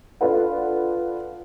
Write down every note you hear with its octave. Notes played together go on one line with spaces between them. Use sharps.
D4 F4 A4 B4 F#5